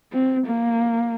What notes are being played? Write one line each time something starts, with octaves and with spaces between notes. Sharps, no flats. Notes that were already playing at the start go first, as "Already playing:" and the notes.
C4
A#3